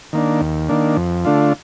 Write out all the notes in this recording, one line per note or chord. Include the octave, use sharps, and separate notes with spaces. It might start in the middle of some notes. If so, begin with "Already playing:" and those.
D#3 A#3 D4
D#2
D#3 A#3 D4
F2
D3 A3 D4 F4